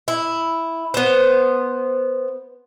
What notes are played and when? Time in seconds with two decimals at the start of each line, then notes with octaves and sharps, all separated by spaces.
0.08 E4
0.94 B3 C5